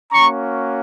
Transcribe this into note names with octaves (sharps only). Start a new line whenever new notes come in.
A#3 C#4 F#4 A#5 C#6